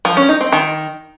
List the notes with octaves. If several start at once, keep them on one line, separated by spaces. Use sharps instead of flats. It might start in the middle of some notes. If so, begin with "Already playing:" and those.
F3
C#4
D#4
C4
D#3